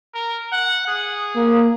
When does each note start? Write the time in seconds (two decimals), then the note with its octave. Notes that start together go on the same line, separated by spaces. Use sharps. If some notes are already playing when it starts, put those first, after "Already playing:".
0.14 A#4
0.52 F#5
0.87 G#4
1.36 A#3